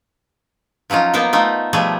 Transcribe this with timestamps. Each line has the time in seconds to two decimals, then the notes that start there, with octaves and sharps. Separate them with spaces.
0.90 F3 F#3 C#4 D#4 F4
1.14 A#3 B3 D#4 A#4 C5
1.33 A3 D#4 F4
1.73 B2 F3 G3 A3 G#4